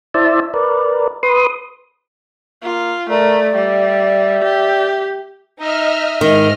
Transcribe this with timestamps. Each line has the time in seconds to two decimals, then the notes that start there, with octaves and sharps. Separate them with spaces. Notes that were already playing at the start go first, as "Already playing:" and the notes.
0.14 E4 C5 D5 E5 A5
0.54 A#4 B4 D5
1.23 B4 C6 D#6
2.63 A#3 F4
3.09 A3 A#4 D5
3.55 G3 E5
4.44 G4
5.58 D#4 D#5 E5 F6
6.21 G#2 D#3 D#5 F6